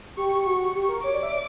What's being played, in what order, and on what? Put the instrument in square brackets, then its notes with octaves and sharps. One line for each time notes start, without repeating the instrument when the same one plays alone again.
[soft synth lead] G4 [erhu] C#6
[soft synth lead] G4
[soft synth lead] F#4 [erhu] C#6
[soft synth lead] G4
A#4
[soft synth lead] C#5 [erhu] D6
[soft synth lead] D5
E5
D5